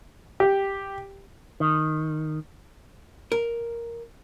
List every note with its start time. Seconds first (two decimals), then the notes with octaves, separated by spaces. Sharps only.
0.40 G4
1.60 D#3
3.32 A#4